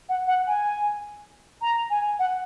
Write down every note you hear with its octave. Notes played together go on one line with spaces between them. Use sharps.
F#5
F#5
G#5
A#5
G#5
F#5